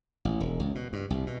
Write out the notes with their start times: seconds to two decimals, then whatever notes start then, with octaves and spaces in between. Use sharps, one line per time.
0.25 A1
0.40 E1
0.60 C#2
0.75 B2
0.93 G2
1.10 C2
1.27 B2